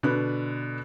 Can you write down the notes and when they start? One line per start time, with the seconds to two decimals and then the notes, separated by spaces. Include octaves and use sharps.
0.03 B2 D3 D4 B4 F#6